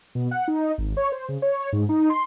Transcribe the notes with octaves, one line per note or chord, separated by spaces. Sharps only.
B2
F#5
D#4
G#1
C#5
C5
C#3
C#5
G#2
D#4
C6